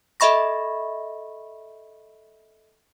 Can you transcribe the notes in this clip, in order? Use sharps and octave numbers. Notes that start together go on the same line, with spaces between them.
A4 D#5 E5 B5 C#6 A#6